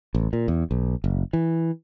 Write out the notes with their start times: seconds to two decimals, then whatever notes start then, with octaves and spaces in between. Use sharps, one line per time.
0.15 A1
0.33 A#2
0.48 E2
0.71 B1
1.04 F#1
1.33 E3